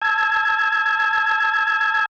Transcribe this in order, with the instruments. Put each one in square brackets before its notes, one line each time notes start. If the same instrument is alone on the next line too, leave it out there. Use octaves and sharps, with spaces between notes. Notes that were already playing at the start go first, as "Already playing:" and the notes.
[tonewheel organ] A5 E6 G#6